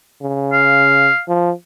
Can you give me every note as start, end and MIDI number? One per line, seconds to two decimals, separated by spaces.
0.21 1.09 49
0.53 1.20 77
1.28 1.51 53